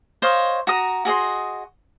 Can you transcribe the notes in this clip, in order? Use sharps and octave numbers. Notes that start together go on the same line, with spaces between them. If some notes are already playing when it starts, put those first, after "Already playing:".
C5 C#5 D#5 F5
F#4 A#5 D#6
F#4 G#4 D#5 C6